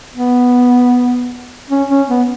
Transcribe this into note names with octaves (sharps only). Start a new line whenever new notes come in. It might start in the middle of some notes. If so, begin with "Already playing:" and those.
B3
C#4
C#4
B3